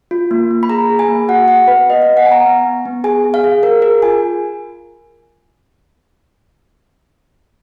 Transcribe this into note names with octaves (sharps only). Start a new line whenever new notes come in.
F4
A#3
A#3
B5
G#4 A#5
G#4
G#5
A#3
F#4 F#5
F#4 F#5
B3 B4
B3 D#5
F5
B3
F#5
B3 G#5
A#5
B3
B3
B3
G#4 G#5
G#4
F5
G#4
G#4 A#4
G#4 A#4
F4 G#5